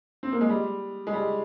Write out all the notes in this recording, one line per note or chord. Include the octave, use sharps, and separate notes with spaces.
C4
A#3
G#3
G3
G#3
G3